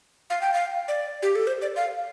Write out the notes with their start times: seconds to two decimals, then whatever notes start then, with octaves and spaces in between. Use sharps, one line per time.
0.30 F5
0.41 G5
0.54 F5
0.88 D5
1.22 G4
1.35 A4
1.47 C5
1.62 D5
1.76 F5